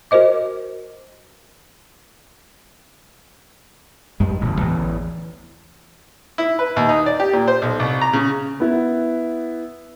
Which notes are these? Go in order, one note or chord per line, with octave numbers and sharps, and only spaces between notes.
F#4 A#4 C5 D#5 D6
F#2 G3 G#3
D1 A1 B2
A1 E2 A2 E3
E4
B4
D#2
D#4
D5
G4
A#2
C5
B1
C2
A#5
C#3
B3 E4